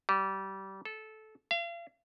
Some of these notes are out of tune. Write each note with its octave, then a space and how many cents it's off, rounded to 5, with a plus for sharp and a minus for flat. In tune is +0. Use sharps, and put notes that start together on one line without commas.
G3 -25
A4 -15
F5 -40